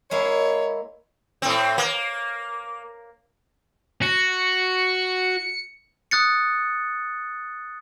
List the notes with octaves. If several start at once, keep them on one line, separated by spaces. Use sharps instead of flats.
G#3 A#3 E4 C#5
A2 C4
A#3
F#4 C#7
D#6 F#6 A6 C#7